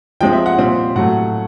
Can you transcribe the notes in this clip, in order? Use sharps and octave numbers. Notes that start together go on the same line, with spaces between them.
F3 G#3 C4 G5
E5
F#5
A#2 G3 C4
A2 F#3 A3 F#5